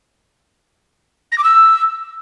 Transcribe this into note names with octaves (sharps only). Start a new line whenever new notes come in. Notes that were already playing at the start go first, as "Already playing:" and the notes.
A#6
D6
E6